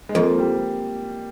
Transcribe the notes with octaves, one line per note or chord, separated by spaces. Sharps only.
G#3
F2 A#3
G3